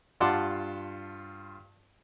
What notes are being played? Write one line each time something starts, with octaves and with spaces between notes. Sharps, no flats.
G2 F4 F#5 A5 C6 D6